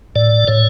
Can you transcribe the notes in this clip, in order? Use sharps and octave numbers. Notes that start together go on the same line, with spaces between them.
A2 D5
A2 C#5